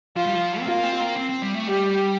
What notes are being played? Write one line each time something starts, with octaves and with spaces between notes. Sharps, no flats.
F3 F4
G3
F3
C4
A#3 F4
C4
A#3
C4
C4
G3
A3
G3 G4